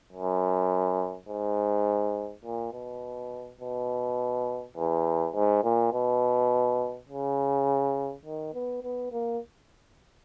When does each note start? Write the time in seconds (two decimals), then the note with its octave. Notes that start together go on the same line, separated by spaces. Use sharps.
0.12 F#2
1.29 G#2
2.45 A#2
2.73 B2
3.61 B2
4.77 E2
5.34 G#2
5.64 A#2
5.93 B2
7.09 C#3
8.25 D#3
8.54 B3
8.83 B3
9.12 A#3